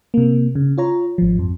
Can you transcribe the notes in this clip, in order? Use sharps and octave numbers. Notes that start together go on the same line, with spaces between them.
C3 A#3
C#3
F4 C#5 A#5
G#1 F3
F2